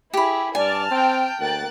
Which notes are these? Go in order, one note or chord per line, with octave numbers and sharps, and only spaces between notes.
E4 G4 G#4 B5
G2 D5 G#5 A5 F6
C4 G5
D2 A#3 F#6 A6